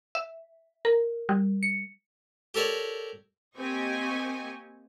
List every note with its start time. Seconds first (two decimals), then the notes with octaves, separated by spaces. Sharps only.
0.15 E5
0.85 A#4
1.29 G3
1.63 C#7
2.54 G4 A4 A#4 C#5 D5
3.57 A#3 C4 G4 D#5 G#5 C#6